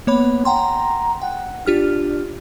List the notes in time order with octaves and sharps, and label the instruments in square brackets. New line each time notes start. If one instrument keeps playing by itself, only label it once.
[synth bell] A#3 C#5 B5 [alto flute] B3
[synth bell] F#5 G5 C6 [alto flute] A#5
[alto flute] F#5 [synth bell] G5
[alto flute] D4 [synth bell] F4 G4 F6